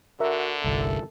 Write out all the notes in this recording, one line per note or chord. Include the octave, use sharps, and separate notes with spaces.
D3 F#4 A#4 E5
G1 C2 A4